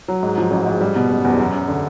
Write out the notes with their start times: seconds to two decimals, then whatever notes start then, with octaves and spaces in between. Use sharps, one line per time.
0.08 F#3
0.23 G#2
0.38 F3
0.51 A1
0.66 G#2
0.81 G3
0.96 B2
1.11 F#1
1.25 E2
1.39 F#2
1.54 F#2
1.68 D3